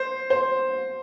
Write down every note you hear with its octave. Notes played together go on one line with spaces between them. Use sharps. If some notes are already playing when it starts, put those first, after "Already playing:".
Already playing: C5
C5